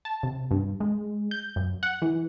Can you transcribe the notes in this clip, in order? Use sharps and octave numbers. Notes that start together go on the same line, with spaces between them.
A5
C3
G2
G#3
G6
F#2
F#5
E3